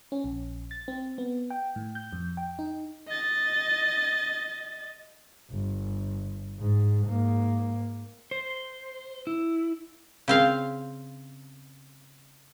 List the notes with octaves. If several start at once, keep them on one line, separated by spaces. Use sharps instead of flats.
C#4
A#1
A6
C4
B3
G5
A2
G6
F2
G5
D#4
D#5 A6
G1
G#2
G#2 A#3
C5
E4
C#3 C4 F5